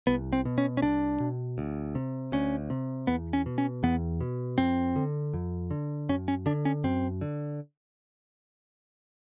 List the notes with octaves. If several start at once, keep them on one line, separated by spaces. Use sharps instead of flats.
C2 B3
C4
B2
C#4
C#4
C2 D4
B2
D2
C3
D2 C#4
C3
E2 B3
C#4
B2
C#4
E2 B3
B2
F2 C4
D3
F2
D3
F#2 C#4
C#4
D3 D4
C#4
F#2 C4
D3